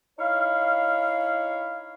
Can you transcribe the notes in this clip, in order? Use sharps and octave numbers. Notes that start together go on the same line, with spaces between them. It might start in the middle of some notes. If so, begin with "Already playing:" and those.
D#4 E4 C#5 F5